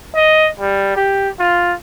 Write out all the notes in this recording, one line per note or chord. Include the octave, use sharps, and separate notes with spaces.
D#5
G3
G4
F4